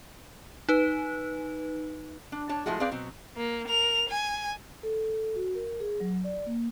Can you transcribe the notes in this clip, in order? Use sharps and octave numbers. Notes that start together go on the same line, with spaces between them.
D#4 B4
D4
D4 C#5 A5
F3 G#3 A3 E4 F#4 G#4
C4 G#4 B4 D5 F5
B2 F#3 C4
A#3
A#4 F7
G#5
A4
F#4
A#4
G#4
F#3
D5
A#3